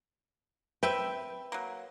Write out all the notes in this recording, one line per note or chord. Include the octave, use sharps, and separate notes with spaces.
C4 B4 E5 G5
F#3 A#3